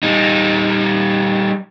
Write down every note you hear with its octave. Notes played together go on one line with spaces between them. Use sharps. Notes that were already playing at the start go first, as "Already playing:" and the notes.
G3 D#4